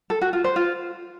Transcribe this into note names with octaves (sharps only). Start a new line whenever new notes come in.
A4
F#4
F4
C5
F4